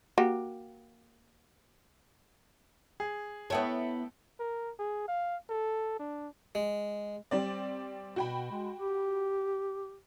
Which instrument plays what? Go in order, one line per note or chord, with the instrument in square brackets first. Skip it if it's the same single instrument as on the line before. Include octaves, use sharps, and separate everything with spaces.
[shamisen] A#3 F#4 G4
[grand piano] G#4
[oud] B3 E4 C#5 [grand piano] A4 G5 A5
[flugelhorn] A#4
G#4
F5
A4
D4
[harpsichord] G#3
[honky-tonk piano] G3 C4 D5
[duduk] B2 [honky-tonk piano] F#4 G5 B5
[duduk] G#3
G4